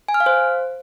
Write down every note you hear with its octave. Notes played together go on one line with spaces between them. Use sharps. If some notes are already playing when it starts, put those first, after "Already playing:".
G#5
F6
F5
C5